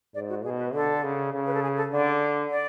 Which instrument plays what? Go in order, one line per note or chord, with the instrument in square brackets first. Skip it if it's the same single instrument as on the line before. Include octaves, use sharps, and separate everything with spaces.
[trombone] G#2 [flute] D5
[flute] F#4
[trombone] B2 [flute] G#4
[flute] B4
[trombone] D3 [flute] A4
[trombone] C#3
C#3
[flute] B4
A4
G#4
A4
[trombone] D3 [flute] D5
[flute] D5